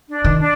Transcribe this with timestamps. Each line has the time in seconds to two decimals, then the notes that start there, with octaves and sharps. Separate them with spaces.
0.10 D4
0.24 D#3
0.39 D4